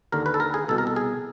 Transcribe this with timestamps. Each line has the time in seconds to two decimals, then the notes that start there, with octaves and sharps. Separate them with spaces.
0.12 D#2 D3 A#4
0.26 B4
0.34 A4
0.40 A#4
0.54 G#4
0.68 C2 B2 A4
0.78 A#4
0.87 A4
0.96 G#4